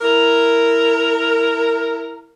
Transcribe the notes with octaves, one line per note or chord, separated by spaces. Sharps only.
E4 A#4